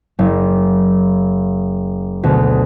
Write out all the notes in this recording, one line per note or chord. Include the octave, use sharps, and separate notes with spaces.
F#1
D2 B2